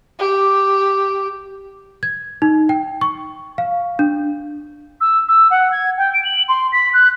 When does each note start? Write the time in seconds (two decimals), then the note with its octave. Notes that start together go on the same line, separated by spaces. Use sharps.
0.20 G4
2.03 G#6
2.42 D#4
2.69 G5
3.01 C#6
3.58 F5
3.99 D4
5.01 E6
5.29 E6
5.51 F#5
5.72 G#6
5.98 G5
6.13 D7
6.25 F#7
6.48 C6
6.72 B6
6.93 F#6